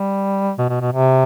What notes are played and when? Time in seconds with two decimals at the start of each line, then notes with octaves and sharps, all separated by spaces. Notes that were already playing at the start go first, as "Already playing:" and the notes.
Already playing: G3
0.58 B2
0.70 B2
0.81 B2
0.93 C3